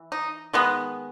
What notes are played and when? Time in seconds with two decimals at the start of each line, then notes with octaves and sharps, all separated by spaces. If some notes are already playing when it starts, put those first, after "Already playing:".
Already playing: E3
0.12 D#4
0.53 D#3 G#3 B3